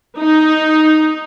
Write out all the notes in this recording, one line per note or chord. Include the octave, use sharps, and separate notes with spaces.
D#4